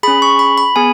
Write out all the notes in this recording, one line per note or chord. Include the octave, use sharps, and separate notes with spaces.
C#4 G#4 B5
C#6
B5
B5
B3 G#4 G#5